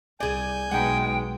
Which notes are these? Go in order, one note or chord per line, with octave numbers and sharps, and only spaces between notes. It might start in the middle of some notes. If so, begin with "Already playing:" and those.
C2 G#4 D5 G#5 G6
B1 G#3 B3 D#4 F#5 G5